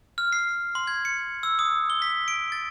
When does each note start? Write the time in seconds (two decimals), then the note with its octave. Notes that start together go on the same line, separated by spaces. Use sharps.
0.18 F6
0.33 C7
0.75 C6
0.87 G#6
1.05 C#7
1.43 E6
1.59 D#6
1.90 G7
2.02 B6
2.28 D7
2.52 A6